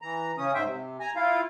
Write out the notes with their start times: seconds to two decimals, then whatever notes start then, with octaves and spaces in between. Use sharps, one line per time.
0.02 E3 A#5
0.38 C#3 C#4 D#6
0.54 G#2 C5 E5 G5
0.66 C3
1.00 G#5 A#5
1.16 E4 F4 F5